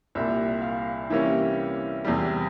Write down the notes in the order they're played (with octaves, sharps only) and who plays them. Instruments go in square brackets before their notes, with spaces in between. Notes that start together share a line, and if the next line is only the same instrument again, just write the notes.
[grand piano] C2 A#2 G3 E5
F5
C3 E3 G3 A#3 C#4 E5
E2 C3 G3